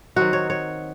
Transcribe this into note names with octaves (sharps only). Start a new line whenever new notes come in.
D#3 F#3 C4 D#4 F#4
C#5
C#5